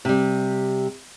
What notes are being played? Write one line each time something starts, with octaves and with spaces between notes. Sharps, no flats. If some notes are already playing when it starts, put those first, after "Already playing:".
C3 G3